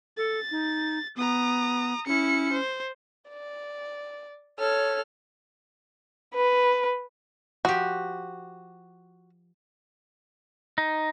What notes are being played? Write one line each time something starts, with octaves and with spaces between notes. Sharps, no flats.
A4 A6
D#4
B3 A#5 D#6
C#4 E4 C#7
C5
D5
A4 C#5 F6
B4
F3 F#4 G4
D#4